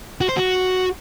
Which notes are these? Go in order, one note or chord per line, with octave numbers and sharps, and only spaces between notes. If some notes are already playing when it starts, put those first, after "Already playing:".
F#4
C5
F#4